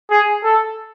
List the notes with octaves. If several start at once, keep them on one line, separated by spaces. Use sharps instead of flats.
G#4
A4